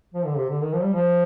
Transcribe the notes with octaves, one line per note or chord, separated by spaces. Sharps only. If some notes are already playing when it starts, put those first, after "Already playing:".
F3
D3
C3
D3
D#3
F3
G3
F3